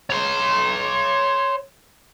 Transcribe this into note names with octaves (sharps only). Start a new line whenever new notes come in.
C#5 C6